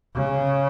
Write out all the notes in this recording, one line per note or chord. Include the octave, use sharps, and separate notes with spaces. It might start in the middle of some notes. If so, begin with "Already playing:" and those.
C#3